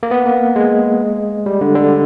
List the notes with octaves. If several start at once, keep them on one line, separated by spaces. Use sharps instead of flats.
A#3
B3
A#3
G#3
G3
D3
D3